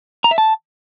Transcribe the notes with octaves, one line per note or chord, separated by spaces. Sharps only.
A#5
E5
A5